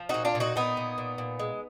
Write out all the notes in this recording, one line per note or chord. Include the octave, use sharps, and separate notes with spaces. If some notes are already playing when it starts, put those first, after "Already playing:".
Already playing: F3
A#2 D#4 F#4
D4 F4
A#2
D#4 F#4
A#2 B3 D#4
A#2
A#2
A#2
G#3